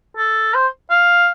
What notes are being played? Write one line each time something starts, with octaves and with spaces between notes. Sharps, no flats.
A4
C5
F5